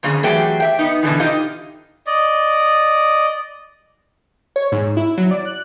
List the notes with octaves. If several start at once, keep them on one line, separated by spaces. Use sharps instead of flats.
F2 D3 A#3 C#4 G#4
E3 F#3 A3 G4 G#4 G5
E5 G5
B3 D#4
B2 D3 E3
D#4 F4 G4 D#5
D5 D#5
C#5
G#2
E4
F#3
D5
F#6